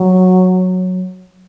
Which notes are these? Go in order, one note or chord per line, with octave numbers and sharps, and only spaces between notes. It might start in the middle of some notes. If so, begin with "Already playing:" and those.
Already playing: F#3